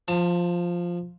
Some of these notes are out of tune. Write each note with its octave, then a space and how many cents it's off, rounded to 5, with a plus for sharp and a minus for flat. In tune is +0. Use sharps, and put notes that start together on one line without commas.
F3 +0 A5 +30